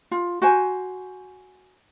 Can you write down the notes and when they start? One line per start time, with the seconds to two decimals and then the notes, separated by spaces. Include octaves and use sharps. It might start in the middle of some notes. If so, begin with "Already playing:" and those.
0.11 F4
0.42 F#4 C5 G#5